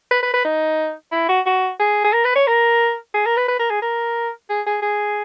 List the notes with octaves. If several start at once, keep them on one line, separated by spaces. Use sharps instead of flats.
B4
B4
B4
D#4
E4
F#4
F#4
G#4
G#4
A#4
B4
C#5
A#4
G#4
A#4
B4
B4
A#4
G#4
A#4
G#4
G#4
G#4